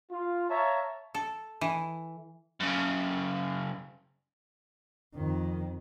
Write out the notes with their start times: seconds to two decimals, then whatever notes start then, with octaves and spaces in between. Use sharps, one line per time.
0.12 F4
0.50 C#5 E5 F5 A5 A#5
1.15 A4
1.61 E3
2.60 F#2 C#3
5.15 F2 D#3